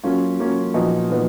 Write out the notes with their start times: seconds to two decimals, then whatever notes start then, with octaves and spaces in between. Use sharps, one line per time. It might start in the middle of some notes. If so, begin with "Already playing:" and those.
0.03 F#3 A#3 C#4 F4
0.39 F#3 A#3 C#4 F4
0.74 A#2 F3 B3 D#4 F#4
1.10 A#2 F3 B3 D#4